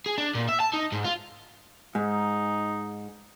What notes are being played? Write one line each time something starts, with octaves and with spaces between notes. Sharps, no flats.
G#4
D4
A#2
E5
A5
D#4
G#2
F4
G#2 D#4